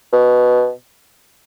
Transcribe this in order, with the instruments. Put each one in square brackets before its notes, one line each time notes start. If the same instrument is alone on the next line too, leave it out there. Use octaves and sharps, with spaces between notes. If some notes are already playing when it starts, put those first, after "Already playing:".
[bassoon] B2